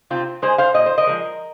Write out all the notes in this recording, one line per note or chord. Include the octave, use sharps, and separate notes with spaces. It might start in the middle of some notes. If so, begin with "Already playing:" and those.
C3 C4 F4
G#3 G#4 C5
C5 F5
A#2 D#5
C5
A#4 D#5
F3 G#3